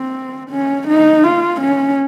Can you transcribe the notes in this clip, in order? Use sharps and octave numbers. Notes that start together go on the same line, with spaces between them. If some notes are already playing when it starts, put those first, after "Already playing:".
Already playing: C4
C#4
D#4
F4
C#4